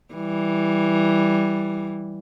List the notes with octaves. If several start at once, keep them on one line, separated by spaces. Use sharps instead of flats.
E3 G3